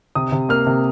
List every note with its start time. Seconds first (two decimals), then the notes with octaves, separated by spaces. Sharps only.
0.15 C3 D#6
0.32 C3
0.49 A#3 F6
0.67 C3